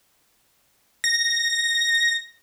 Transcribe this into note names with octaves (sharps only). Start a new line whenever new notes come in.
A#6